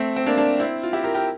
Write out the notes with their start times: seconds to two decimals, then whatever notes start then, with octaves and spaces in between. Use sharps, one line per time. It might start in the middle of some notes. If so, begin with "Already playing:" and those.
Already playing: A3 C4
0.16 C4
0.26 A#3 D4
0.38 A#3 D4
0.60 C4 E4
0.83 F4
0.93 E4 G4
1.04 G4 A#4
1.15 G4 A#4